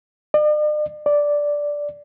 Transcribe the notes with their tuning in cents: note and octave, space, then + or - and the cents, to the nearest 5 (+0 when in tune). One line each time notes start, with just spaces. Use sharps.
D5 +45
D5 -5